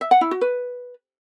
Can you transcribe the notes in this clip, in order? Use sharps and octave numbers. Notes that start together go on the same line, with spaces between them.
E5
F#5
E4
F#4
B4